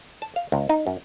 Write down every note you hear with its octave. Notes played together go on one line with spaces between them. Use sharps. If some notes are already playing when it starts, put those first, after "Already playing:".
A5
F5
C#2
D#4
F#2